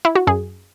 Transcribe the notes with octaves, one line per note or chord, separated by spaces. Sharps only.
E4
F#4
F#2 G#4